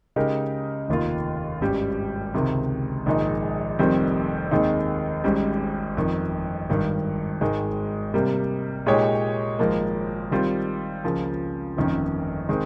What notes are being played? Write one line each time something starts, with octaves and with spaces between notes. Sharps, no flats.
C#3 G#3 D#4 G4 A#4
F1 D#2 D#3 A#3 F4
G#1 G2 G3 C#4 G4
C#2 C3 D#3
A#1 G#2 D#3 G#3 D#4
F1 F2 D#3 G3 C4
D#2 D#3 G#3 C4 D#4
G#1 G#2 G3 C#4
G1 F2 D#3
G#1 G2 D#3
G#1 G#2 D#3 G#3
C3 G3 A#3
A#2 G#3 D#4 G4 C#5
G#1 G#2 F3 A#3
D#3 G3 C4 F4
C#2 C#3 F3 A#3
G1 F2 D#3 A#3 C#4
D#3 G#3 C4